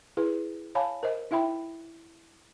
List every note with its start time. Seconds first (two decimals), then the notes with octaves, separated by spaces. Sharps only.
0.17 E4 G#4 B4
0.75 C#5 F5 G#5 A5 B5
1.03 A#4 C5 D#5
1.31 D#4 E4 E5 G5 B5